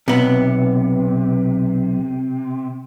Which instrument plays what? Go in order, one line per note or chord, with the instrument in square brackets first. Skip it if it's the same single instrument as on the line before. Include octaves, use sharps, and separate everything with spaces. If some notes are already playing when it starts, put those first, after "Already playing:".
[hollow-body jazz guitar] B1 B3 [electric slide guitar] C3